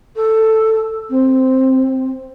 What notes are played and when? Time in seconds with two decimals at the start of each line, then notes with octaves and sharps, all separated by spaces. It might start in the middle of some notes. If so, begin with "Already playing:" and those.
0.15 A4
1.09 C4